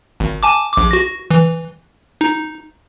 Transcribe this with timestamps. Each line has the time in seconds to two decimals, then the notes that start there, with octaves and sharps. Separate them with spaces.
0.20 G#1
0.43 G#5 A5 D6
0.73 A#1 D6
0.91 F#4 A#6
1.31 E3
2.21 D#4